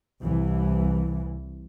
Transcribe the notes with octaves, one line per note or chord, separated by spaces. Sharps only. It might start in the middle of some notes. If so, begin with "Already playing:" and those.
C2 E3